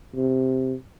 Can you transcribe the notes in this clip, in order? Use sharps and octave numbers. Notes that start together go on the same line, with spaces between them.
C3